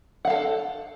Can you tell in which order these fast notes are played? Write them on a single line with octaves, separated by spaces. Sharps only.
F#5 F5 A4